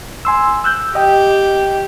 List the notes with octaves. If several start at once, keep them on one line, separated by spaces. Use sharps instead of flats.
G#5 C6 E6
E6 F#6 G6
G4 D#5 G5